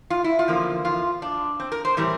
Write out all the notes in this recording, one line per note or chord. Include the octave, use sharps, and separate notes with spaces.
F4
E4
F4
E2 D3 F3 A#3
F4
D4
C4
A#4
C5
A2 E3 G3 C4 A#4